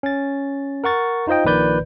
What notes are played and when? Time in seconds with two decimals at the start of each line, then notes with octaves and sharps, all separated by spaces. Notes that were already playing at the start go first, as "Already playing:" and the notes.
0.03 C#4 A6
0.84 A#4 F#5 C#6 A6
1.27 D#4 F4 C5 D#5 G5
1.45 A#1 A#2 D#3 B4 D5 G6